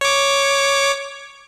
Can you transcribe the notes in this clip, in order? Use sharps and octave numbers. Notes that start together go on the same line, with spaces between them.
C#5 D6